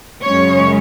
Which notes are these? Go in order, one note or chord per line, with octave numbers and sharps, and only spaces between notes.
F#2 C#3 G#3 C#4 C#5